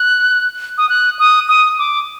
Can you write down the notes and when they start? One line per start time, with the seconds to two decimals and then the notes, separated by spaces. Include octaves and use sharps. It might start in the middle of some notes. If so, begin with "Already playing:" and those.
Already playing: F#6
0.78 D#6
0.89 F#6
1.19 D#6
1.48 D#6
1.79 D6